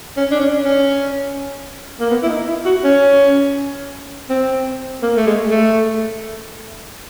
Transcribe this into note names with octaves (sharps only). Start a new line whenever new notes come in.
C#4
D4
C#4
C#4
A#3
B3
E4
D#4
E4
F#4
C#4
C4
A#3
A3
G#3
A3